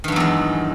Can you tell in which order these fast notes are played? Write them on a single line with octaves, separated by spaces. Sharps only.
D#3 G2 F#3 E2 G#3